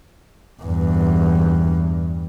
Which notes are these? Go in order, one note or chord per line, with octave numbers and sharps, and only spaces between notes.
E2 G2